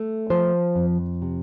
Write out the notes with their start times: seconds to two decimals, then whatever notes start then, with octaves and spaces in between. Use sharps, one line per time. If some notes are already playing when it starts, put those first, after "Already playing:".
Already playing: A3
0.30 F3 C5
0.75 F2
1.22 C3